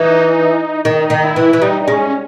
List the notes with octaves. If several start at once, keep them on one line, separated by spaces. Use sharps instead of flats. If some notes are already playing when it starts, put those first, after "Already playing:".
Already playing: E3 D#4
D#3 D#4
D#3
E4
E3
E3
G3 D#4
D#4
G#3 C#4